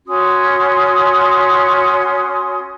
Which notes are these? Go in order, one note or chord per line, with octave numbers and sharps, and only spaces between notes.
C#4 F#4 C6 D#6